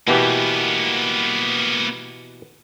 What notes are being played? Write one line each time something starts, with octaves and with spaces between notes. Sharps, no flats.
B2 E3 A#3 B3 G4